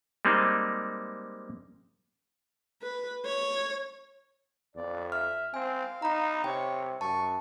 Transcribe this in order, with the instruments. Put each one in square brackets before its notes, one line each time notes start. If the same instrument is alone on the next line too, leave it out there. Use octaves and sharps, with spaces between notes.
[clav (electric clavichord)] G3 G#3 A#3 C4 D#4
[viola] B4
C#5
[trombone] F2 [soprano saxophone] D5
[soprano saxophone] E5 [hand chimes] F6
[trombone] C4 [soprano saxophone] F5 [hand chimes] G#5
[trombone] D#4 [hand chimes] A#5 B5
[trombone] C3 [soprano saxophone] C#5 [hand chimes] G5
[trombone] F#2 [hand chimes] A5 [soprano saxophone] C#6